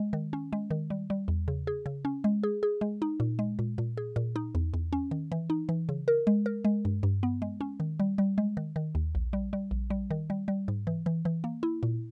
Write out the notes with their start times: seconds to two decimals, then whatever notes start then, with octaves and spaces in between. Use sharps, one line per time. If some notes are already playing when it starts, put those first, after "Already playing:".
Already playing: G#3
0.13 D#3
0.33 C#4
0.53 G#3
0.71 D#3
0.90 G3
1.10 G3
1.28 E2
1.48 C#3
1.67 G#4
1.86 C#3
2.05 C#4
2.24 G#3
2.43 G#4
2.63 G#4
2.81 G#3
3.02 D#4
3.20 A#2
3.39 G#3
3.59 A#2
3.78 A#2
3.97 G#4
4.16 A#2
4.36 D#4
4.55 E2
4.74 E2
4.93 C#4
5.11 D#3
5.32 E3
5.50 D#4
5.69 E3
5.89 C#3
6.08 A#4
6.27 G#3
6.46 A#4
6.65 G#3
6.85 G2
7.03 G2
7.23 B3
7.42 G#3
7.61 C#4
7.80 D#3
8.00 G3
8.18 G3
8.38 G#3
8.57 D#3
8.76 D#3
8.95 D#2
9.15 A#1
9.33 G3
9.53 G3
9.71 A#1
9.90 G3
10.11 D#3
10.30 G3
10.48 G3
10.68 G#2
10.87 E3
11.06 E3
11.25 E3
11.44 A#3
11.63 E4
11.83 A#2